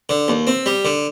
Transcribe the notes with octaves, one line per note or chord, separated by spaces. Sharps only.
D3
D#2
C4
G3
D3